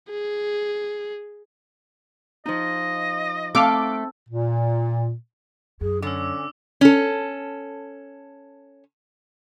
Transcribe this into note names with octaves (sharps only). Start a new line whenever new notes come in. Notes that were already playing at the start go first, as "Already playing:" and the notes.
G#4
F3 D#4 D#5
A3 C4 F5 D6 E6
A#2
F#2 G#4
D3 C#4 D6 E6
C#4 A4